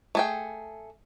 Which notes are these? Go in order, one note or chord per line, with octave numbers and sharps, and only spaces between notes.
A3 G#4 G5